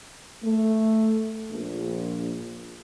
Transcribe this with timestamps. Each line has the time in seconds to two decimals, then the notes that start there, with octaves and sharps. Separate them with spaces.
0.43 A3
1.51 A#1